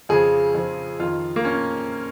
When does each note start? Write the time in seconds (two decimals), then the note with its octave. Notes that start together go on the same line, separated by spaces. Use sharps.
0.09 F2 C#3 F3 G#4
0.55 F2 C#3 F3
1.00 F2 D#3 F4
1.36 A#3
1.45 C#4